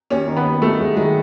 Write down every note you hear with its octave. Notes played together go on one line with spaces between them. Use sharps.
D#2 C#4
D#3
B3
D#2
D#2 A3
D#2 G#3
D#3 G#3